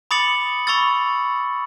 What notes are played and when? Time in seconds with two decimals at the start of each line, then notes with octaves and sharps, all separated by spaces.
0.11 B5 D6 D#6 A6 C#7 F#7
0.67 B5 C#6 E6 A6